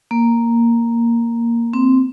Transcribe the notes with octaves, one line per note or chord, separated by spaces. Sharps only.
A#3
C4